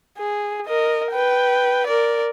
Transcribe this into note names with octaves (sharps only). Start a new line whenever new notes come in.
G#4
A#4 D#5
B4 G5
A#4 D5